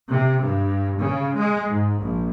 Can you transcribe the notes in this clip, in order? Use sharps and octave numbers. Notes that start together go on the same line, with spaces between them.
C3
G2
C#3
G#3
G#2
A#1